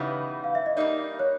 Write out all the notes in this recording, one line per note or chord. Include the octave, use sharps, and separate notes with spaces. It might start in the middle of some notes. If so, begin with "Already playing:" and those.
Already playing: C#3 E3 G3 B3 D#4
F5
E5
D#5
G3 A#3 D#4 D5
C#5